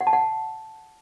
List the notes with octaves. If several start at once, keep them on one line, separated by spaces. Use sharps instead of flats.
F#5
A5
F#5